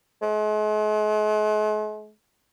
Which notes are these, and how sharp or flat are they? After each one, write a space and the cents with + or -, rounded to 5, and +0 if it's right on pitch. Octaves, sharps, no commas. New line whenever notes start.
G#3 +45